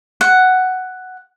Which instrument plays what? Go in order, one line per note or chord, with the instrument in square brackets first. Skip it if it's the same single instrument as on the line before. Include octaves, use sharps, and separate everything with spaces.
[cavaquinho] F#5